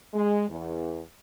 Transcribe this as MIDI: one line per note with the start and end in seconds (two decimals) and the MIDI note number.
0.14 0.48 56
0.49 1.00 40